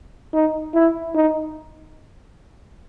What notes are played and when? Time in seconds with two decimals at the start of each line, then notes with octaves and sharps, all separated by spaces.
0.34 D#4
0.74 E4
1.15 D#4